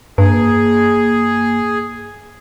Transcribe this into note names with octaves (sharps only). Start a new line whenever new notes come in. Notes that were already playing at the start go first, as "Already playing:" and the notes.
G2 A#3 G#4